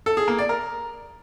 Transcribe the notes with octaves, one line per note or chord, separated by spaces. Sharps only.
A4
G#4
A#3
D5
A#4